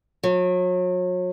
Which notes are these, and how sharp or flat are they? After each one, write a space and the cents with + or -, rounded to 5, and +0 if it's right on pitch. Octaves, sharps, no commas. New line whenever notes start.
F#3 -35